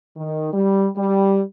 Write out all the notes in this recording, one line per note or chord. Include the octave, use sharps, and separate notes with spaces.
D#3
G3
G3